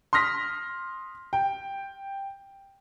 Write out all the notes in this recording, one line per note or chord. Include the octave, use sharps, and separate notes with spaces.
C6 D#6 F6 A#6 B6
G5